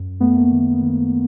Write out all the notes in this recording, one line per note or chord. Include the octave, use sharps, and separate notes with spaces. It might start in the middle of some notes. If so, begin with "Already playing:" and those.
Already playing: F#2
F#2 A3 B3
A#3
D#3
D#3